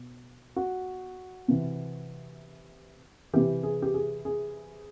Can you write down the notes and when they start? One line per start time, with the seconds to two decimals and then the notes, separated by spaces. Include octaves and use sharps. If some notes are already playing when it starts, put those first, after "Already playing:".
Already playing: B2
0.56 F#4
1.48 C3 E3
3.33 C3 E3 G4
3.63 G#4
3.82 G4
3.94 G#4
4.25 G#4